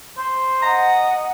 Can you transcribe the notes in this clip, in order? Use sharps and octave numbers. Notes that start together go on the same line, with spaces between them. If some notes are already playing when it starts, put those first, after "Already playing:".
C5
D#5 F#5 A#5